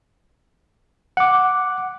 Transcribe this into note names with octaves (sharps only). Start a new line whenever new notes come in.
F#5 D6